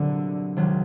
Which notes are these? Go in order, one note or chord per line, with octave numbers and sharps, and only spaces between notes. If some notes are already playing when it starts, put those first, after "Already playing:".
Already playing: C2 A#2 D3 F#3
C#2 C3 D#3 F#3